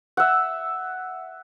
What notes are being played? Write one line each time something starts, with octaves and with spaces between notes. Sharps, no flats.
E5 F#5